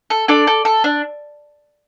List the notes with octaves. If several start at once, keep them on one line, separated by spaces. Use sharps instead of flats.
A4
D4 A4 D5
A4
A4
D4